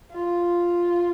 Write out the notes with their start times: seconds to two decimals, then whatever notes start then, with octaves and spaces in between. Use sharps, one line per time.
0.12 F4